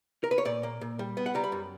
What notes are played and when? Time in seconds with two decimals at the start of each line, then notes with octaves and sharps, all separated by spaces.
0.24 A#4
0.31 B4
0.38 C#5
0.45 A#2 D5
0.63 A#3
0.81 A#2
0.99 G3
1.17 B3
1.26 F#5
1.35 G3 A#5
1.44 B5
1.52 F#2